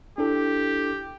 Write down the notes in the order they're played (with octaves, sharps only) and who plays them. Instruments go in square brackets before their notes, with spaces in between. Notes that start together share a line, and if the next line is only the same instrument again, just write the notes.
[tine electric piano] D4 E4 A4 [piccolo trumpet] G4